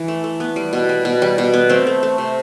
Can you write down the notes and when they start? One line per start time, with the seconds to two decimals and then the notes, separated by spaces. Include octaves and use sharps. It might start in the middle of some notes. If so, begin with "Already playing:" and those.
Already playing: E3
0.08 A3
0.24 A3
0.40 B3
0.56 G3
0.73 B2
0.89 G3
1.05 B2
1.22 G3
1.38 B2
1.54 B3
1.69 A3 C4
1.87 A3
2.03 A3
2.18 C3